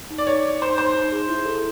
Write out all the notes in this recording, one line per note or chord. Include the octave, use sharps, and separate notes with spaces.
D#4
D5
D#4 C#5
D#4
D#4 C5
D#4 C5
D#4
G#4
E4
A4